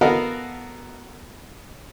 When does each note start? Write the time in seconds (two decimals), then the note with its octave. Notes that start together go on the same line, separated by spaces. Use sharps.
0.01 B3 F#4 A4 A#4 D#5 F5